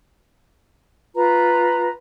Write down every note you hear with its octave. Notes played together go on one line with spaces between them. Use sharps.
F4 B4 A#5